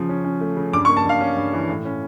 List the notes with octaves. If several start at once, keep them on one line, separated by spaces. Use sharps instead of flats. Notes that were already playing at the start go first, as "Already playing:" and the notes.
Already playing: C#3 F3
C#4
C#4
A3
C#3
G2 D6
C#6
A#3
A5
G2 F5
C#4
G2
E3
A2
C#4